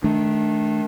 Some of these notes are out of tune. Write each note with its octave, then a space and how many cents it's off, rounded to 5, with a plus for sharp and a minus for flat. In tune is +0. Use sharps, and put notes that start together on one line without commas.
D#3 +10 A3 -25 D4 +0